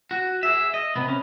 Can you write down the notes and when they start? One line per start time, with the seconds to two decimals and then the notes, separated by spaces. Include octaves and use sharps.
0.11 F#4
0.43 G#4 E5
0.74 D#5
0.96 C3 B3
1.08 C#4